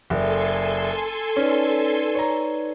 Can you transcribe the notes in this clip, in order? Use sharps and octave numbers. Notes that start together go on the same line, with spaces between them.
F#1 A4 D5 E5 G#5 C6
C#4 D#4 B4 D5
C#5 A#5